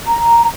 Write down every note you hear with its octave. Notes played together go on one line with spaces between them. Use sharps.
A#5